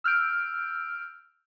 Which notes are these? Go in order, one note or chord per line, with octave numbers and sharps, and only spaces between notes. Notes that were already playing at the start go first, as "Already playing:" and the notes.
E6 F6 G6 D7